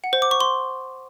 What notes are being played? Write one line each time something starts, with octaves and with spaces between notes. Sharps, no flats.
F#5
C5
D6
C#6
C6